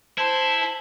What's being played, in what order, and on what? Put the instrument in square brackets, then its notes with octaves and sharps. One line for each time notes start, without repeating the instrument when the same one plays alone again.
[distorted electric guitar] E4 [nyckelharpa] C5 [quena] A5